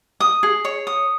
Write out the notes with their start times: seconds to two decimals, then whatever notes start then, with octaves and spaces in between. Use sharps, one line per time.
0.20 D#6
0.43 G#4
0.65 C#5
0.87 D#6